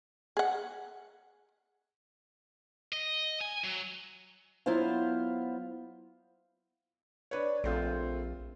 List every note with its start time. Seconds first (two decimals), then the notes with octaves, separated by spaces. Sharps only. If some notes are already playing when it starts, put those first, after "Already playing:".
0.37 G#4 F#5
2.93 D#5
3.41 G#5
3.64 F#3
4.66 F#3 B3 E4 F4 C5 F5
7.31 D4 B4 C#5
7.64 A#1 A3 C4 F4